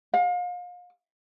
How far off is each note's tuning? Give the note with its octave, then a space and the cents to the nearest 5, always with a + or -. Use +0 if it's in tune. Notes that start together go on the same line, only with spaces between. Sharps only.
F5 +35